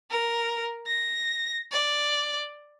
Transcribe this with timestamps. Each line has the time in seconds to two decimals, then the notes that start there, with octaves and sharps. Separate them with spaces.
0.11 A#4
0.87 A#6
1.72 D5